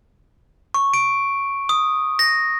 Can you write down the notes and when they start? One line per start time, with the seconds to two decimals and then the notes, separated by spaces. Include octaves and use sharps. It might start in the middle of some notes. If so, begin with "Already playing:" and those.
0.74 C#6
0.94 D7
1.69 D#6
2.19 A#6